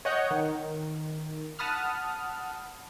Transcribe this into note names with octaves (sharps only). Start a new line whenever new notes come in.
C#5 D#5 F#5 G6
D#3
F#5 A5 B5 D#6 F6